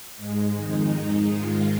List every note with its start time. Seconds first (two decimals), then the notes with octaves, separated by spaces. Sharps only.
0.16 G#2 G#3
0.55 F2 D#3 G#3 D#4
0.93 G#2 G#3
1.32 G#2 D#3 G#3 F4